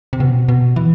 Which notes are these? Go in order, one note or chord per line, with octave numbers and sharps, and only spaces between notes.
C3
B2
B2
E3